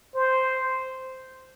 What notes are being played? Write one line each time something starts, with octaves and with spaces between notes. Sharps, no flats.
C5